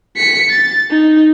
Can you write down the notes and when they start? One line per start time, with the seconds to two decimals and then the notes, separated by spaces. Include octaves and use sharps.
0.17 B6 C#7
0.51 A6
0.90 D#4